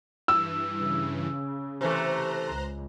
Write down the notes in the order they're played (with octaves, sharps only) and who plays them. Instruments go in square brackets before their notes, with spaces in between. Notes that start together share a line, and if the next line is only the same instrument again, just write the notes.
[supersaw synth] G2 E3 [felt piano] E6
[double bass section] C#3
[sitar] C3 E3 A3 [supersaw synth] C5 A#5 F#6
[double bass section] C#2